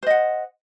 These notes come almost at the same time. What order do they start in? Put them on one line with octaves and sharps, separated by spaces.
C5 D#5 F#5